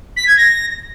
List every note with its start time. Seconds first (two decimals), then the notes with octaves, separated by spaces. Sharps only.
0.17 B6
0.27 G#6
0.38 A#6